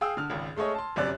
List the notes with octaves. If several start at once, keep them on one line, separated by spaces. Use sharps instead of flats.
G#4 F5 G5 D#6 E6
D3 F6
G#1 C#2
G#3 A3 G#4 C#5 D#5
A5 C6
G1 F#2 C3 D5 F#6